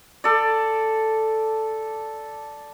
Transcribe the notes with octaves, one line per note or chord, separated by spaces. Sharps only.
A4 D5